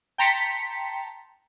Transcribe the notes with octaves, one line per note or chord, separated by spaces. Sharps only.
G5 A5 A#5 C6 B6 C#7